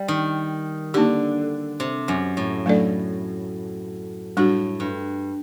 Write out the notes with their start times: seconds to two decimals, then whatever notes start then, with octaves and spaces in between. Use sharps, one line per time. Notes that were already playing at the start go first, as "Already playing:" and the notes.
Already playing: G3
0.08 D#3
0.94 D3 A#3 D#4 G4
1.80 C3
2.08 F#2
2.37 A2
2.66 F#3 A3 D4 A4 D5
4.37 A2 G3 D4 F#4
4.80 G2